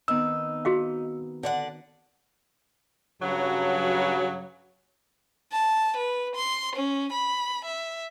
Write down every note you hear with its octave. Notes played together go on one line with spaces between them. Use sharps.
D#3 B3 C4 D#4 E6
F#4 G#4 F5
D3 D5 F#5
G2 C#3 F#3
A5
B4
C6
C#4
B5
E5